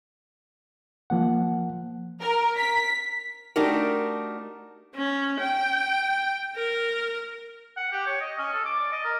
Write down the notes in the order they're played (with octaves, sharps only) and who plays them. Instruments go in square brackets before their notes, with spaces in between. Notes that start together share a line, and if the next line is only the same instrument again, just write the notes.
[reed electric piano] F3 A#3 F#5
[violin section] A#4
B6
[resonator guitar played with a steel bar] A3 D4 D#4 F#4 G4 A#4
[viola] C#4
G5
A#4
[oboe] F#5
G4
C#5
D#5
C#4
A4
D6
D5
D#5
A#4